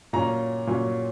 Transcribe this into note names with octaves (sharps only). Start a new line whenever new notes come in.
A#2 F#3 C#4 A#5
A#2 F#3 C#4